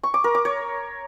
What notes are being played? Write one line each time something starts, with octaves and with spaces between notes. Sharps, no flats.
C#6
D6
A#4
D6
C#5